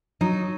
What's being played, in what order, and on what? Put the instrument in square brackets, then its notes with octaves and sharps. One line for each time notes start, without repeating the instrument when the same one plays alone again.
[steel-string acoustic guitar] F#3 [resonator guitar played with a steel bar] D#4